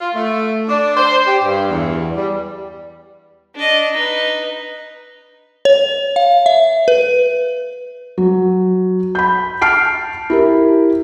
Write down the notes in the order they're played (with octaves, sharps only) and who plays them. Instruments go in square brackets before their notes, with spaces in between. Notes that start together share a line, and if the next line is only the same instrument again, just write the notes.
[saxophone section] F4
A3
D4
C5
G4
G2
E2
G3
[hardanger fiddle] D4 D#5
D#4 B4
[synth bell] C#5
F5
E5
B4
[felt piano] F#3
B5 G6
A5 F6 C7 D7
E4 G4 A#4